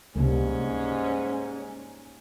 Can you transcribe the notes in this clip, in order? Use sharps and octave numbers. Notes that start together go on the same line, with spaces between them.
C#2 G#2 C3 G3 A#3 C#4